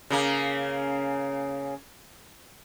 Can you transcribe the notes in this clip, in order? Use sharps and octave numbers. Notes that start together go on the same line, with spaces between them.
C#3 A#3